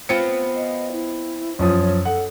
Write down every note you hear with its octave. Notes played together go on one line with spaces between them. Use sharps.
B3 C4 F4 C#7
D#5
E4
F#2 F3 C#5 D#6
A4 F#5